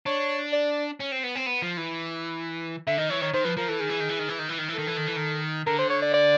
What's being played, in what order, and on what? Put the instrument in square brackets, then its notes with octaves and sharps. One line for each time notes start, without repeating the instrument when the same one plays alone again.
[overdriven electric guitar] D4 [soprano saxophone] C#5
[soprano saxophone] D5
[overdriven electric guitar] C#4
C4
B3
C4
B3
F3
E3
[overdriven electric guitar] D3 [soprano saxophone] E5
[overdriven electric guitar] D#3 [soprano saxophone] D#5
[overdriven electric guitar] E3 [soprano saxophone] C#5
[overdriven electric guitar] D#3 [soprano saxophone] C#5
[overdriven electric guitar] D#3 [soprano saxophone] C5
[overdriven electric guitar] F3 [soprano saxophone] B4
[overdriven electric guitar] F3 [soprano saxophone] A#4
[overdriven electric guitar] E3 [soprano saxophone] A4
[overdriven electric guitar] D#3 [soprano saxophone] G#4
[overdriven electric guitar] E3
D#3
E3
D#3
E3
D#3
E3
D#3
E3
[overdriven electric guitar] D#3 [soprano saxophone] A4
[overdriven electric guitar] E3
D#3
E3
D#3
[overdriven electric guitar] D3 [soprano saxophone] A#4
[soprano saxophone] C5
C#5
D5
D5